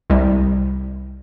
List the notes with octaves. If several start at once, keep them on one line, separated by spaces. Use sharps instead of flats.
C2 G3